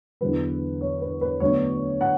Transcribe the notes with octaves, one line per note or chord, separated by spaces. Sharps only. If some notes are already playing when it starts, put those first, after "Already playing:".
E2 D3 F#3 B4
C#5
B4
B4
D2 D3 F#3 B3 D4 C#5
F#5